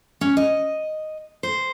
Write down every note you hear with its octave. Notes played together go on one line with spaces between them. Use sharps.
C#4
D#5
C5